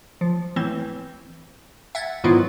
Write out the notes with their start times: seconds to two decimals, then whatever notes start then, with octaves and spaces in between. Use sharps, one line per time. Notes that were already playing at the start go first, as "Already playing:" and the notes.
0.21 F3
0.56 A2 E3 C4
1.95 E5 F#5 G#6 A6
2.24 G#2 D#3 F#3 B3 E4 F4